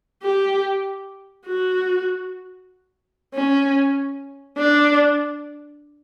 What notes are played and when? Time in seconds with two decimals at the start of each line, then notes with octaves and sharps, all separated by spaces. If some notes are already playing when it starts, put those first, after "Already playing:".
0.23 G4
1.47 F#4
3.34 C#4
4.58 D4